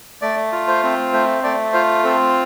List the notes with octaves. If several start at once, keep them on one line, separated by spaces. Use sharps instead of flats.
A3 D5
F4
C5
C4
A3 C5
A3 D5
F4 C5
C4 A4